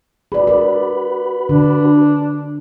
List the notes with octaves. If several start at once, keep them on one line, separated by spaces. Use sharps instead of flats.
F#4 G#4 B4 D5 B5
A#4 D5
D3 D4